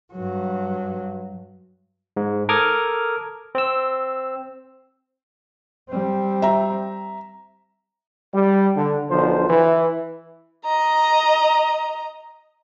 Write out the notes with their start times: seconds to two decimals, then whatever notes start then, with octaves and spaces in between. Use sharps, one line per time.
0.13 G2 F#3
2.16 G#2
2.49 A4 A#4 D6 D#6 F6 G#6
3.55 C4 E6
5.89 G3 C4
6.42 E5 A#5
8.34 G3
8.77 D3
9.10 B1 D3 F3 C5
9.49 E3
10.65 D#5 A#5